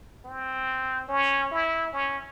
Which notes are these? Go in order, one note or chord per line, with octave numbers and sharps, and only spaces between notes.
C4
C#4
E4
C#4